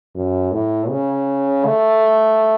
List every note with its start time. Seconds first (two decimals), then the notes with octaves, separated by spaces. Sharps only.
0.15 F#2
0.52 A2
0.89 C#3
1.65 A3